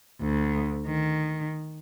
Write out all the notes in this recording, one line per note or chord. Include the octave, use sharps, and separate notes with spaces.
D2
D#3